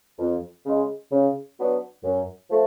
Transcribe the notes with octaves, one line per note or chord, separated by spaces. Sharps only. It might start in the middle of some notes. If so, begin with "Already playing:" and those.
F2
C#3 G#3
C#3
F#3 B3 D4
F#2
F3 A3